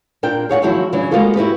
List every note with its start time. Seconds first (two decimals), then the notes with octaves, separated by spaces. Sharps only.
0.23 A#2 D4 A#4 G5
0.49 G#4 C#5 F5 F#5
0.62 D#3 F3 F#3 G#3 E4 F#4
0.92 C#3 E3 F#3 D4
1.11 G#3 A#3 B3 F4 F#4 A4
1.36 E4 F#4 G4 B4